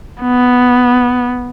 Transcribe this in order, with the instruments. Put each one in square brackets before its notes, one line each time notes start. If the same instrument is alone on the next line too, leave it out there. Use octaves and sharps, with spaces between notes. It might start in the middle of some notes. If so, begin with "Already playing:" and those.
[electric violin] B3